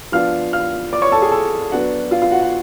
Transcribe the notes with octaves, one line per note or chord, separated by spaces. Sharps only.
F3 B3 D4 F4 F5 F6
F5 F6
D5 D6
C#5 C#6
A4 A5
G#4 G#5
A4 A5
F#3 B3 D4 F#4 F#5
F4 F5
F4 F5
F#4 F#5
F#4 F#5